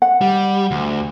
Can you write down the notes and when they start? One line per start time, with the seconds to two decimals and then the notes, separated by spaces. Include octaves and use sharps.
0.02 F#5
0.21 G3
0.71 D2